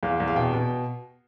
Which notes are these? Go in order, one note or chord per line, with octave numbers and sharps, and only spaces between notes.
E2 F5
E2
F5
B2 G5
B2